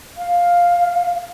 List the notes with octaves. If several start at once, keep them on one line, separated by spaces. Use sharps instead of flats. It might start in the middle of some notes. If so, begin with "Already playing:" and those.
F5